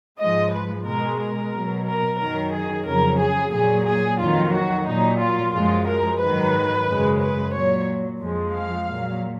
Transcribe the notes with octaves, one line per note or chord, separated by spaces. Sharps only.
G#2 F3 G#3 D#5
B4
B2 G#3 A#4
A#4
B2 F#3
A#4
F#2 D#3 F#3 A#4
G#4
F2 C#3 F#3 A#4
G#4
A#2 F#3 G#4
G#4
F2 D#3 F#3 F4
F#4
A#2 F#3 D#4
F4
F#2 F3 G#3 F4
A#4
G#2 D#3 F#3 B4
F#2 C#3 G#3
B4
A#2 F#3 C#5
F2 F3 G#3
F5
A#2 F#3